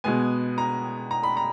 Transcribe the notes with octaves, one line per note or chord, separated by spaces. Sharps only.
B2 G#3 B3 G#5
A#5
A#5
B5
A#5